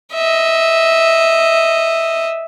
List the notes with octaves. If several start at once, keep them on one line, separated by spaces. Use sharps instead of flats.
D#5 E5